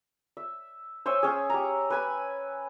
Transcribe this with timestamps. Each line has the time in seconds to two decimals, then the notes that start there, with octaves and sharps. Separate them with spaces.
0.37 E5
1.06 C5 C#5 E5 G#5
1.23 C#4 G#4
1.50 G4 A#5
1.90 B4 G#5 B5